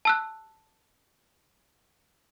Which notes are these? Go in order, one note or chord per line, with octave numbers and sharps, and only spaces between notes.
A5 E6 F#6